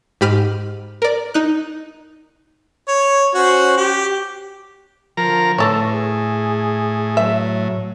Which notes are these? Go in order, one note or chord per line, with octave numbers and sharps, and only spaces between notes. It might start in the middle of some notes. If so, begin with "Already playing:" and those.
G#2 G4 B5 F6 D#7
A#4 D5
D#4 F#6
C#5
C#4 F#4 C5
G4
D3 F3 A#4 A#5
A2 E3 A4 C#5
G#4
F#3 E5